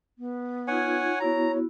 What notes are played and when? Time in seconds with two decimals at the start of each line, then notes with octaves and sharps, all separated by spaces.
0.19 B3
0.68 D#4 F4 C#5 F#5 G#5
1.20 B3 E4 F#4 C#5 A#5